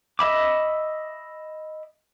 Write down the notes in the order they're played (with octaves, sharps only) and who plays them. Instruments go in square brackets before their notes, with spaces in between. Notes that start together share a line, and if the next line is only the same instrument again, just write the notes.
[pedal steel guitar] D#5 E5 B5 D6